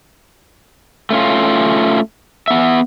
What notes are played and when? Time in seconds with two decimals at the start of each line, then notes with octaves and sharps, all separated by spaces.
1.11 A3 C#4 F4
2.48 B3 E5